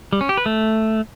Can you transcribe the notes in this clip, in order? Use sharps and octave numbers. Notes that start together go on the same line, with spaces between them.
G3
C#4
G4
B4
A3